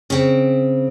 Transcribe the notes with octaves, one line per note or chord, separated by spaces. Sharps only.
C#3 C4